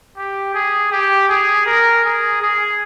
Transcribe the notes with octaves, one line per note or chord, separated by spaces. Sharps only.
G4
G#4
G4
G#4
A#4
G#4
G#4